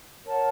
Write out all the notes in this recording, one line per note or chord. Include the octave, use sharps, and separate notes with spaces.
A#4 C#5 F#5 A5